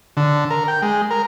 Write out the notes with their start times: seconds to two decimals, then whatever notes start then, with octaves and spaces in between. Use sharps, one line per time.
0.17 D3
0.50 A#4
0.68 G5
0.82 G#3
1.11 A#4